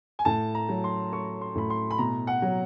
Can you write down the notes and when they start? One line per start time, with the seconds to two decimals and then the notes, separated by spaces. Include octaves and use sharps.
0.19 G#5
0.25 A2 A5
0.55 A#5
0.69 F#3
0.84 C6
1.12 A3 C#6
1.41 C6
1.55 A2 B5
1.70 C6
1.91 B5
1.98 B2 A#5
2.27 F#5
2.42 F#3